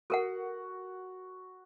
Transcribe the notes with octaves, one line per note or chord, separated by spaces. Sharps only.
F#4 A4 A#4 F#5